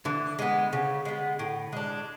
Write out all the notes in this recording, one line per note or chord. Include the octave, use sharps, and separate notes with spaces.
D3 E3
G#3 B3
C#3
G#3 B3
A2
G#3 D4